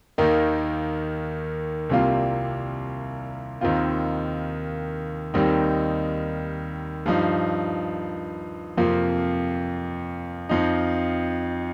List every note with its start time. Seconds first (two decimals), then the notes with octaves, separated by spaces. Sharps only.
0.18 D#2 D#3 A#3 D#4
1.90 C2 C3 G3 A#3 F4
3.61 D#2 D#3 C4 F4
5.34 D#2 D#3 G3 C4 D#4
7.06 G2 F3 D#4
8.77 F2 C3 F3 A#3 F4
10.49 F2 F3 D#4